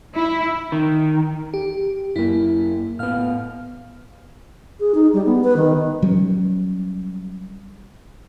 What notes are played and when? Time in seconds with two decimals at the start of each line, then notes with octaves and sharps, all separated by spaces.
0.15 E4
0.72 D#3
1.54 G4
2.16 F#2 A#3 E4
2.99 A2 B3 F5 F6
4.80 G#4
4.94 D#4
5.13 G3
5.26 B3
5.44 B4
5.56 D#3
6.02 F#3 G3 C#4